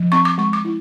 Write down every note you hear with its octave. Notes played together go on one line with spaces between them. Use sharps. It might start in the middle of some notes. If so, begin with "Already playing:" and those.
Already playing: F3
C4 C#6
D6
G#3 C#6
D6
E4